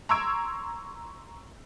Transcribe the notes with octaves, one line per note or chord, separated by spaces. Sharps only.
A#5 C6 C#6 E6 G#6 D7